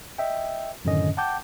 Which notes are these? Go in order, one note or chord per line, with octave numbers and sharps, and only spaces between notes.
D#5 E5 G5
F#2 A2 D3 D#3 C#4 D#5
F#5 G5 A5 D6 G6